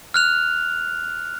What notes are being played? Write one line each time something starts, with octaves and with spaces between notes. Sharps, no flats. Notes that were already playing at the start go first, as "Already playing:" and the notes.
F6 F#6 F7